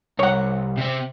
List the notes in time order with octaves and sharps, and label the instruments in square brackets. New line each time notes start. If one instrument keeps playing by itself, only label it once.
[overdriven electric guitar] C2 [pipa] C#5 F#5
[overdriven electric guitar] C3 C4